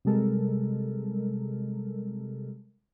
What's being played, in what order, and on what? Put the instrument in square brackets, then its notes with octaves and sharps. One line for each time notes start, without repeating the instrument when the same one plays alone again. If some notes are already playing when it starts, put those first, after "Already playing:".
[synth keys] C3 G3 G#3 A4 A#4